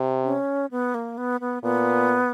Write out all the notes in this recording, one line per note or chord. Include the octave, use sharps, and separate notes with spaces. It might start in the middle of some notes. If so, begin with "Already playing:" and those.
Already playing: C3
C#4
B3
A#3
B3
B3
A#2 B3